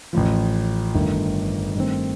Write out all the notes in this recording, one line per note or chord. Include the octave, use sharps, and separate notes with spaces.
A1 A2 F3
G1 G2 D#3 A3
G2 D#3 A3 C4